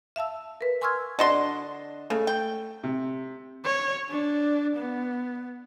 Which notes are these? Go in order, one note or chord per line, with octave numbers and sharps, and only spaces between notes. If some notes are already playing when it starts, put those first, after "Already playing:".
E5 F5 A5 E6
A#4 B4
G#5 C6 C#6 E6 F6 G#6
D3 D4 F#4 D#5 C6
C#3 A3
G5
C3
C#5
D4
B3